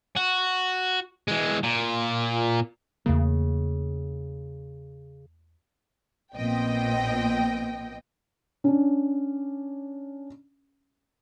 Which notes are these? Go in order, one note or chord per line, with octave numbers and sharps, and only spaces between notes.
F#4
E3 G#3
A#2
E2 C#3 A3 A#3
A#1 A#2 B3 C4 D#5 G5
C#4 D4